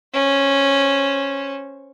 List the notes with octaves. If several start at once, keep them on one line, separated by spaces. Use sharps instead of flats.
C#4 C5